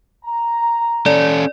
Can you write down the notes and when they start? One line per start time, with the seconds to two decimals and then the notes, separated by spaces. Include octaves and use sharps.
0.25 A#5
1.06 C#4 A4 D5